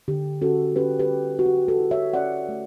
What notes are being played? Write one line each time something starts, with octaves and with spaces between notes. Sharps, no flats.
D3 G4
C#4 F#4 A4
C#4 G4 B4
G4 B4
C#4
F#4
C#4 G4
F#4 A4
E4
C#5 E5
C#4 D5 F#5
A3